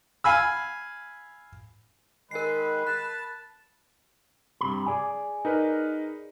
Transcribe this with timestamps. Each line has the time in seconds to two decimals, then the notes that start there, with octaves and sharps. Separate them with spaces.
0.24 F5 G#5 B5 E6
2.31 D#3 G#3 A#4 B4 C7
2.87 A5 F#6
4.61 G2 C3 B5
4.86 G#4 D5 G#5
5.45 D#4 A#4 B4